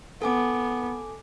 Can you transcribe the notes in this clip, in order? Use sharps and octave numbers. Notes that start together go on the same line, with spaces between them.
B3 A4 G#5 D6